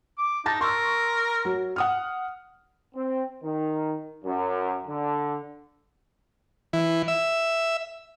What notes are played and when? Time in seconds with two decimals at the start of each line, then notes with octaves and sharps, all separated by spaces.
0.18 D6
0.46 D#4 A5 A6 A#6
0.61 A#4 C6 C#6 E6
1.45 F#3
1.76 F#5 D#6 F6
2.94 C4
3.42 D#3
4.24 F#2
4.87 D3
6.73 E3
7.08 E5